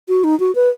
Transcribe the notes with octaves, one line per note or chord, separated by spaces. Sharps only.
F#4
D#4
F#4
B4